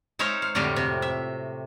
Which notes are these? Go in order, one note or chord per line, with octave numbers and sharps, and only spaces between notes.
G#3 D#4 C5 C#5 E5 F5
F5
F2 A2 D3 F#4 G4 F5
C3
E5